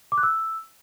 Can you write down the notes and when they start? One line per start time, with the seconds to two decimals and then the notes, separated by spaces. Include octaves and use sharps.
0.12 D6
0.18 F#6
0.23 E6